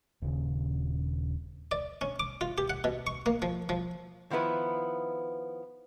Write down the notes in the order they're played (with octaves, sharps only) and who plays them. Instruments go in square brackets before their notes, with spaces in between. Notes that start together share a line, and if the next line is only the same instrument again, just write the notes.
[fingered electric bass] D#1 C#3
[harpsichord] D5
C#4
D6
F4
G4
F#5
B2
C#6
A#3
F3
F3
[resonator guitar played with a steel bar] D#3 F3 B3 E4 B4